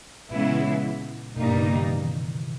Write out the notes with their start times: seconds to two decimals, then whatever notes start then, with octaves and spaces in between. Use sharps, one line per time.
0.30 A#2 C#3 E3 G#3 B3 E4
1.36 G2 B2 G3 A#3 D#4
1.54 C#3
1.71 D#3
1.89 E3